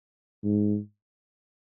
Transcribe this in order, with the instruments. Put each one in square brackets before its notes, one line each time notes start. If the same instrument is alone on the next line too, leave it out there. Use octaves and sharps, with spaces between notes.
[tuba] G#2